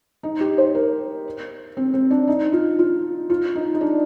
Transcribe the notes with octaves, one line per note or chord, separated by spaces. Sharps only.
D#4
G4
C5
A#4
C4
C4
D4
D#4
F4
F4
F4
D#4
D#4
D4